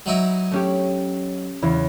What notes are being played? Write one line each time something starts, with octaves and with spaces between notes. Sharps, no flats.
F#3 D#4 E4
A3 C#4 G4
E2 C#3 E3